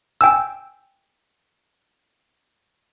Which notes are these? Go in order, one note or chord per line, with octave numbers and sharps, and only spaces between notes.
G5 G#5 E6